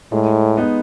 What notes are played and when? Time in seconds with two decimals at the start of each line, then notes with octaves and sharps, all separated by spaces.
0.12 A2 G#3
0.57 B3 D#4